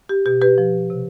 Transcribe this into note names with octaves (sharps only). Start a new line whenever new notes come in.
G4
B2 G4
G4 B4
F3
C3